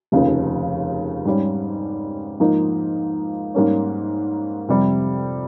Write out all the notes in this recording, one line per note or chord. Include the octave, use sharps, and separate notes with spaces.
F1 D#2 C#3 F3
G#2 G3 C#4
G#2 F3 A#3 D#4
G#2 G3 A#3 C#4
F2 C3 G3